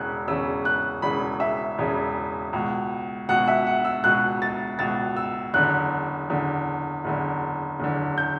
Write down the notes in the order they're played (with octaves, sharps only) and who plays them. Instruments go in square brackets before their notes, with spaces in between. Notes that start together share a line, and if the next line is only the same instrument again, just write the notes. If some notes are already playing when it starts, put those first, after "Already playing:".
Already playing: [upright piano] E1 E2 C#3 F#6
E1 E2 C#3 E6
F#6
E1 E2 C#3 B5
E5
E1 E2 C#3
C#2 B2
C#2 B2 F#5
E5
F#5
E6
C#2 B2 F#6
A6
C#2 B2 A6
E6
F#1 E2 D3 F#6
F#1 E2 D3
F#1 E2 D3
F#1 E2 D3
G6